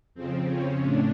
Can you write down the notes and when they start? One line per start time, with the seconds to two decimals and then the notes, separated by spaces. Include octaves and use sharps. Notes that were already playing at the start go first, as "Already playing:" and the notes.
0.15 F2 C#3 F3 C4
0.48 C#4
0.82 A2 D4